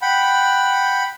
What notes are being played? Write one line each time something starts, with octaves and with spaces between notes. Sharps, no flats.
F#5 G5 B5